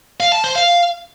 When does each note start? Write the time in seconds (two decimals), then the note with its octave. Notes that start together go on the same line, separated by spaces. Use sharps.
0.20 F5
0.32 A5
0.44 C5
0.56 F5